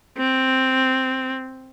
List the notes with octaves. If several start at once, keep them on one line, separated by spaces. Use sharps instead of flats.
C4